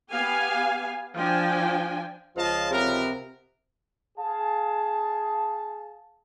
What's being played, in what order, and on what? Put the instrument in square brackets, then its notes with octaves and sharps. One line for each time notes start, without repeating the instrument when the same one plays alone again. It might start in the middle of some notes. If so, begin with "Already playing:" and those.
[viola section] B3 G4 F5 G#5
F3 D4 G5 G#5
[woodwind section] C#2 F3 [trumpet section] D#5 F5 A5
[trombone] C3 [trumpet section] B3 A#4
[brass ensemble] G#4 F5 A5